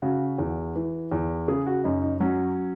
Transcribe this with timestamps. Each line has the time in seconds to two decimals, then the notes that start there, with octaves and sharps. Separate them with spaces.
0.02 C#3 F#4
0.38 E2
0.75 E3
1.12 E2
1.48 C#3 G#4
1.66 F#4
1.84 F#2 D#4
2.02 D#4
2.20 F#3 C#4